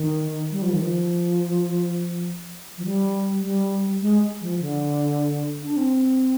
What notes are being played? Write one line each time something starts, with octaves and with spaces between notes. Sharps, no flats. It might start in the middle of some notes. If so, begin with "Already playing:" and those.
Already playing: D#3
G3
F3
D#3
F3
F3
G3
G3
G#3
F3
D3
D4
C4